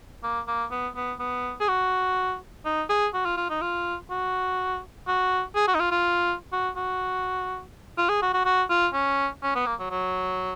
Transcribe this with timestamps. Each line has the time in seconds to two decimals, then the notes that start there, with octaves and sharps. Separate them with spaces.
0.23 A#3
0.48 A#3
0.71 B3
0.96 B3
1.20 B3
1.60 G#4
1.68 F#4
2.65 D#4
2.90 G#4
3.14 F#4
3.25 F4
3.37 F4
3.50 D#4
3.61 F4
4.11 F#4
5.07 F#4
5.56 G#4
5.68 F#4
5.75 D#4
5.80 F4
5.91 F4
6.52 F#4
6.76 F#4
7.98 F4
8.09 G#4
8.22 F#4
8.34 F#4
8.46 F#4
8.70 F4
8.94 C#4
9.43 C#4
9.55 B3
9.66 A#3
9.79 F#3
9.91 F#3